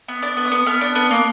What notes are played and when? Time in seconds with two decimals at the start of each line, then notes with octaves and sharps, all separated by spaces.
0.08 B3
0.22 D4 D6
0.37 B3
0.45 D#6
0.52 B3
0.66 B3 F6
0.81 D4
0.95 B3
1.11 A#3